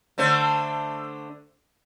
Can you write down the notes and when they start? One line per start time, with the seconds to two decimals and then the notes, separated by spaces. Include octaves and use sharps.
0.18 D3 A3 C5